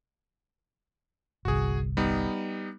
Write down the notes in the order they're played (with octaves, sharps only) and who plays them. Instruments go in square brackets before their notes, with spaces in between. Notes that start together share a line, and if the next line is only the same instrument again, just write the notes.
[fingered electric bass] G1 C2 [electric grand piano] F#4 G#4
[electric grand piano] G3 B3 D#4